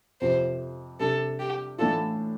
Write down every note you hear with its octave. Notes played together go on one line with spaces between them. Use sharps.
F2 C3 F3 C5
C3 G3 D4 A4
G4
A2 E3 A3 D4 F4 A4